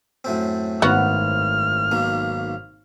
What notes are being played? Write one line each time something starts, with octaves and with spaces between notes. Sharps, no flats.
F#2 A2 C4
G#1 B3 F#4 F6
B1 A#3